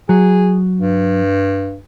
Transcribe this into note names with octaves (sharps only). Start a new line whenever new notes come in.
F#3 G#4
G2